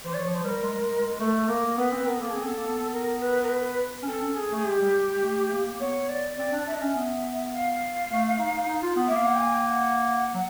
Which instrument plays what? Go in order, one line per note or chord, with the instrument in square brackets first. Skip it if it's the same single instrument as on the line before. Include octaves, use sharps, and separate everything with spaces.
[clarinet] E3 [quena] C5
[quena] D5
[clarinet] E3 [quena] C#5
[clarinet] F3
[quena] C5
[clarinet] G3 [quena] B4
[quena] A#4
[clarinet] G#3
G3
G#3
G#3
[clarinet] A3 [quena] A4
[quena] A4
[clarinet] A#3 [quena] A#4
[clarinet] B3 [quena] B4
[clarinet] C4
[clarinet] B3 [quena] A#4
[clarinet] A#3 [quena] A4
[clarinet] C4 [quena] G#4
[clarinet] B3 [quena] A4
[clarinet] A#3
B3
[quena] A#4
B4
A#4
B4
[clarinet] C#4
[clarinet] C4 [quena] A4
[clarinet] C#4
[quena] G#4
[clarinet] A3
[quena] G#4
[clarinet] G#3 [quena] G4
[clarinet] G3
G#3
A3
A#3
A#3
[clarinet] B3 [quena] C#5
[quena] D5
[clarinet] C4 [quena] D5
[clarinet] D4
[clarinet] D4 [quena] E5
[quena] D#5
[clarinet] C#4 [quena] E5
[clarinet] B3
[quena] F5
[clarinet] A3
D#4
D#4
F4
B3
[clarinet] A#3 [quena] E5
[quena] F5
F#5
G5
G#5
G5
F#5
[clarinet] F#3